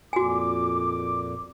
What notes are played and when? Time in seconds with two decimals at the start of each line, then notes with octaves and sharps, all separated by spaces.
0.13 F2 A#2 F#4 G#5 D6